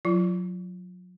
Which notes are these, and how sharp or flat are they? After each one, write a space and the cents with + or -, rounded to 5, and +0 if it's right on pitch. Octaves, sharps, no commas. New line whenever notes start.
F#3 -35 F4 -35